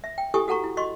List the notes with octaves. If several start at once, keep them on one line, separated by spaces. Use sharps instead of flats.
E5
G5
E4 G4 A4 G#5 C#6 D#6
F#4 A4 F#5 A#5 C#6
E4
F#4 D#5 C6 C#6